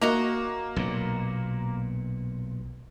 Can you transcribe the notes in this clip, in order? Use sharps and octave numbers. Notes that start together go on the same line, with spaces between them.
A#3 F#4 D#5 A#5
B1 A#2